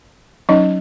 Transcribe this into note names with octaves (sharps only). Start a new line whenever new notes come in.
F#3 C#4 D#4 D#5